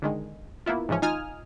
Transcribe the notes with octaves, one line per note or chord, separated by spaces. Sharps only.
D3 D#3 G#3
A#3 B3 E4 F4
G#2 C#3 E3 F3 C#4
A1 D#4 F4 G#5 D#6 F6